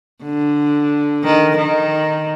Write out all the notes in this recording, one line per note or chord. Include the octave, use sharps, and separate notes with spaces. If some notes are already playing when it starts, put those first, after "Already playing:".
D3
D#3
D#3